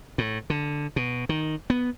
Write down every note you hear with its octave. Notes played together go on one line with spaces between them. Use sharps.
A2
D3
B2
D#3
B3